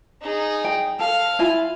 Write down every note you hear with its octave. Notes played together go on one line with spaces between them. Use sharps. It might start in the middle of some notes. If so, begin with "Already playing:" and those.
D#4 G#4
G5
A4 F5
E4 F4 G#5